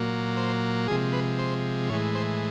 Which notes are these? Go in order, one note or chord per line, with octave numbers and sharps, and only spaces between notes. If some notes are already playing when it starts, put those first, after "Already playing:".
Already playing: A#2 F#3 A#3
C5
C3 F3 G#3 G#4
B4
C5
A2 E3 G#3 C#5
C5